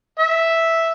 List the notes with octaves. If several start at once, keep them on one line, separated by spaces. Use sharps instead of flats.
E5